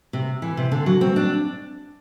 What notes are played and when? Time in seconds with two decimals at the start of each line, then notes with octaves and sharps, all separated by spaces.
0.13 C3
0.42 E3
0.57 C3
0.72 D3
0.86 F#3
1.01 C4
1.16 D4